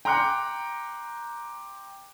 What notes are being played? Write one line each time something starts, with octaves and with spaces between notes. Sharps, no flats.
G5 A#5 C6 D6 F#6 C#7